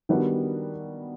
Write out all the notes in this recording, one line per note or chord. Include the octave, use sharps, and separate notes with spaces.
D#3 G3 B3 D4 F#4